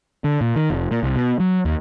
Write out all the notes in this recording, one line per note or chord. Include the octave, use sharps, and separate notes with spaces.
D3
A#2
D#3
F1
A#2
C2
B2
F#3
D#2